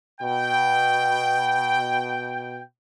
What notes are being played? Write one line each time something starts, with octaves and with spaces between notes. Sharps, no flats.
B2 G5